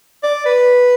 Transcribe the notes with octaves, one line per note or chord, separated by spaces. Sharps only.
D5
B4